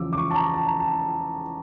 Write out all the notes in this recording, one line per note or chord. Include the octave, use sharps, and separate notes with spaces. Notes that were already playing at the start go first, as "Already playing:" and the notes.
Already playing: E2 C#3 F3 D6 E6
D6
C#6
A5
A#5
A5
A#5
A5